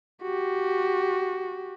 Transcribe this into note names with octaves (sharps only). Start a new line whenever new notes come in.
F#4 G4